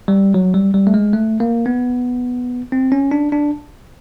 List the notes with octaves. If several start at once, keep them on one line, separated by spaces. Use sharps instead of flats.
G3
F#3
G3
G3
A3
G#3
A3
A#3
B3
C4
C#4
D4
D4